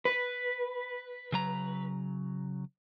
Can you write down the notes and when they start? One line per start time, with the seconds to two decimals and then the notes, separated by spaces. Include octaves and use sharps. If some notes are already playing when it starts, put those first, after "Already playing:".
0.05 B4
1.32 C#3 F#3 A#5